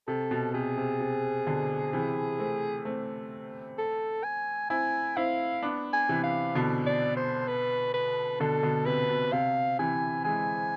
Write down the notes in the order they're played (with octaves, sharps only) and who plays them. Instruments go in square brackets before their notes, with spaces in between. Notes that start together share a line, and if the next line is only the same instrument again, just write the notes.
[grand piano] C3 [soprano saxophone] A4
[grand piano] B2
[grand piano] C3 [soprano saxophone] G#4
[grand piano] C3
C3
B2 D3
C3 E3
A3 C4
A3 C4
[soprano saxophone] A4
G#5
[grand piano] C4 E4 [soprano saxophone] G#5
[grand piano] C4 E4 [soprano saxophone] F5
[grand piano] B3 D4
[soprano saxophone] G#5
[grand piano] C3 E3
[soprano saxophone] F5
[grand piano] B2 D3
[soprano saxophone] D5
C5
B4
B4
[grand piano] B2 D3 [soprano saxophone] A4
[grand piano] B2 D3
[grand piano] C3 [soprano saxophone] B4
[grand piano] B2
[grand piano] C3 [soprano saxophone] F5
[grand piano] C3 E3 [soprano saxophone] G#5
[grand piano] E3 G#3 [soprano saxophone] G#5